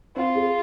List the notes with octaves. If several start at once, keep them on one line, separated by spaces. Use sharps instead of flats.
C4 F4
G#4